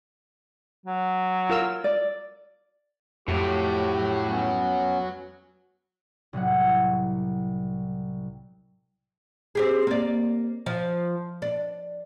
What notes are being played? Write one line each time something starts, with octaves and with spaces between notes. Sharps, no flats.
F#3
F4 A#4 E6
D5
F2 A2 F#4 G4 C#5
B3 C#4
C2 A2 F#3 F#5
C4 G4 G#4
A#3 D5
F3
D4